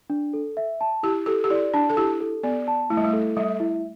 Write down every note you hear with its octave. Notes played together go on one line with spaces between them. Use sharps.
D4
A4
E5
A5
E4 G4
G4 A4
G4
E4 D5
D4 A5
A4
E4 G4
A4
B3 D5
A5
A3 E4
G3
A3
A4
G3 E5
E4